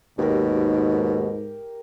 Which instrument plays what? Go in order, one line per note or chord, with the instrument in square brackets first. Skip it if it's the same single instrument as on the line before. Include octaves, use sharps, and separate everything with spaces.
[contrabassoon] D#2 [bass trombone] G#2 [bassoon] B2 [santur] G4 A#4